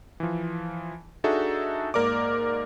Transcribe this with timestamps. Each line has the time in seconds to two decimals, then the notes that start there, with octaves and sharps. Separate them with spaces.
0.20 E3 F3
1.24 D4 D#4 F#4 G#4 A4 E5
1.94 G#2 A#3 A#4 D5 D6